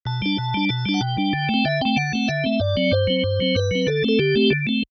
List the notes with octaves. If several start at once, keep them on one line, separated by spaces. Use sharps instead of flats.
B2 A5
G3 D4
B2
G3 D4
B2 A5
G3 D4
F#5
B2 G5
G3 D4
D3
A3
C4
D3 E5
A3 C4 G5
D3 F#5
A3 C4
D3 E5
A3 C4
G2 D5
F#3 C4
G2 C5
F#3 C4
G2
F#3 C4
G2 B4
F#3 C4
D3 A4
A3 C4 A4
D3 G4
A3 C4
D3
A3 C4